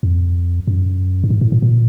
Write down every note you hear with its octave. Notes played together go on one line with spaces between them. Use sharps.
F2
F#2
G2
G#2
A2
A#2
A#2